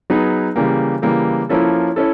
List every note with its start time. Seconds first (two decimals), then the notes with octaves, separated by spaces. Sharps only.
0.10 F#3 B3 D#4 G#4 B4
0.56 C#3 E3 G3 A#3
1.02 C#3 E3 G3 A#3
1.49 F3 A#3 C#4 E4 A4
1.96 C#4 E4 A4